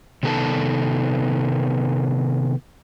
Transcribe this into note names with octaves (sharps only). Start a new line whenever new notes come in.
C3 D#3 B3 A4 B4 A5